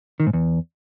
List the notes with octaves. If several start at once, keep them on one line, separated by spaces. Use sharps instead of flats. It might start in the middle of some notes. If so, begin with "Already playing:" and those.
D#3
G#2
E2